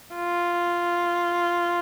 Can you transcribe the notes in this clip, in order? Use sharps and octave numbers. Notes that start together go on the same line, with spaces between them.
F4